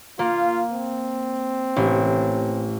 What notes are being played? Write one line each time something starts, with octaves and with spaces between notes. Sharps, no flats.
A#3 F4
C4
A1